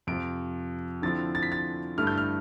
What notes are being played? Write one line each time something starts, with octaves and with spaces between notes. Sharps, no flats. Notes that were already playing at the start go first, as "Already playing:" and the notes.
F2 C3 F3 D7
D3 F3 C4 E4 A6
A6
B6
A6
G2 D3 A3 E4 F6
G6
F6